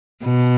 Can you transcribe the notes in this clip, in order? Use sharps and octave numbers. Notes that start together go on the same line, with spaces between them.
B2